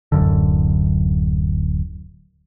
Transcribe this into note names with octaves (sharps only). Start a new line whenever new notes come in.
D1 G#1 F#2 D3